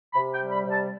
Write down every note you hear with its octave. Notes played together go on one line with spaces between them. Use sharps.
C3 B5
G5
G3
B5
C3
A5